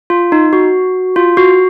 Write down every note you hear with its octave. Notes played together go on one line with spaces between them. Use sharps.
F4
D#4
F#4
F4
F#4